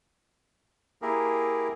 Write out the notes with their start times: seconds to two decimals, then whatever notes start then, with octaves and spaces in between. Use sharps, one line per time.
1.02 A#3 E4 G4 G#4 A#4